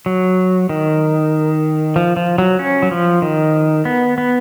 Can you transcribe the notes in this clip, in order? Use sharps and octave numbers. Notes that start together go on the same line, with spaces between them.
F#3
D#3
F3
F3
F#3
C#4
F#3
F3
D#3
B3
B3